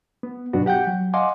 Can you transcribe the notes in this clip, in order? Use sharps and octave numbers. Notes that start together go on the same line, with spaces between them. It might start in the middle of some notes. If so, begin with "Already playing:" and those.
B3
G2 B2 F#3 B3 D4 F#4
G4 F#5 G5 G6
F#3
D#5 F5 F#5 G#5 C6 D6